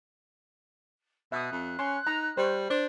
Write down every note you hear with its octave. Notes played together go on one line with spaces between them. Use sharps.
B2 E5 D#6 F#6
F2
C#4 C6
D#4 A#5
G3 C5 C#6
D4 C5